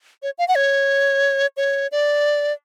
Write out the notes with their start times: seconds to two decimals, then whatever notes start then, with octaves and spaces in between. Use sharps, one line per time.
0.23 C#5
0.38 F5
0.48 F#5
0.55 C#5
1.57 C#5
1.92 D5